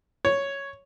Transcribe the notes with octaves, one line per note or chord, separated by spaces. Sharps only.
C#5